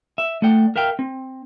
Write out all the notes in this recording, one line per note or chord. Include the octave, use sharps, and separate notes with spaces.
E5
A3 D5 F#5 G5
A#4 E5 F5 G5
C4